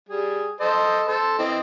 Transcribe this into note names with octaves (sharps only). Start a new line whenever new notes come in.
G3 G#4
A4 C5 D#5
A4 C5
E3 C4 D#5